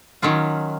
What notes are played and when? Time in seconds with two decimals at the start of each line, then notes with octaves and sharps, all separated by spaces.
0.22 D#3 F#3 C#4 F4